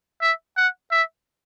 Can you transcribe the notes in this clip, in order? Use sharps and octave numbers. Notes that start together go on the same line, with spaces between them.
E5
F#5
E5